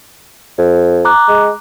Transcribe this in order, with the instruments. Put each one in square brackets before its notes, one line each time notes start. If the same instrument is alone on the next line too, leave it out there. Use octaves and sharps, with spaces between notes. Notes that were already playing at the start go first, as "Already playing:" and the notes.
[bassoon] F2
[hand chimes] A#5 D6 F#6
[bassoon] G#3